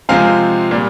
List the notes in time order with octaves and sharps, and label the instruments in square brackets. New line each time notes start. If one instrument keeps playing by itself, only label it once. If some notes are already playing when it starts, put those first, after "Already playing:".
[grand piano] C3 F3 G#3 C4 F5 G#5
A#2 G3